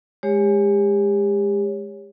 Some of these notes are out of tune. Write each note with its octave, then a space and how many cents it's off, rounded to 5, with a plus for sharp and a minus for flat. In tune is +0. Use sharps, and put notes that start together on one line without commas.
G#3 +0 G4 +35 C#5 +0